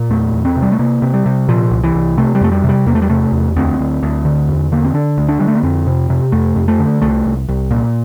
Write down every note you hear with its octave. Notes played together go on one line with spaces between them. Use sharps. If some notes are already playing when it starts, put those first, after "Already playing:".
Already playing: A#2
E2 A3
E2
C4
C3
G3
A3
C3 A#3
C3
G3
C3
A#2 F3
C2
E3
C2
C3 A3
G3
F2 A3
G3
C3
G3
E2 A#3
A3
G3
C3 A3
E2
D2 C4
D2
D2
D3
E2
D3 A#3
C4
D3 D4
D2
D4
D3 G3
A3
A#3
F2 C4
C3
C3
F2 A3
F2
A3
D3
C2 A3
C2
C2
A#2